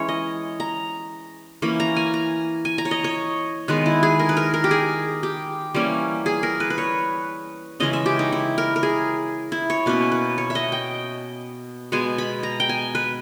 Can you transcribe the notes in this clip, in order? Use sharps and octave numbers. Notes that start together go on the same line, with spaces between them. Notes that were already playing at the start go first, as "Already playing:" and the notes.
Already playing: E3 G#3 C#4 C#5
D#5
A#5
E3 A#3 C#4 B5
A#5
G#5
A#5
G#5
A#5
C#5
D#5
C#5
D#3 G#3 B3 B4
E4
G#4
A#4
B4
A#4
A#4
G4
G#4
G4
E3 G3 A#3 C#4
G#4
A#4
B4
B4
C#5
C#3 E3 G#3 C#4 D#5
E5
G4
D#4
E4
A#4
A#4
G#4
E4
C#5
B2 A#3 C#4 B4
B4
C#5
E5
D#5
G5
B2 G#3 B3 G#5
B5
A#5
G5
G#5
B4